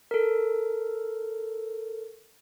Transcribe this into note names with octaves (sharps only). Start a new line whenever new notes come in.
A4 A#4